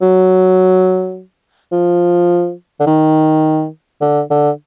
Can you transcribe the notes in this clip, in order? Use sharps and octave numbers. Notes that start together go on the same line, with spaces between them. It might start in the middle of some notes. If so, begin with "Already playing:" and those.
F#3
F3
D3
D#3
D3
D3